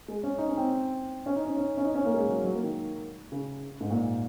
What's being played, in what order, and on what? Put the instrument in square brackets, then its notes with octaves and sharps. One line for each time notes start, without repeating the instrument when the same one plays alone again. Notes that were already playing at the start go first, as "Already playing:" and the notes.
[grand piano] G#3
C#4
D#4
C#4
C4
C#4
D#4
C#4
C#4
C#4
D#4
C#4
A#3
G#3
F#3
F#3
A#3
D#3
C#3
G#2
A#2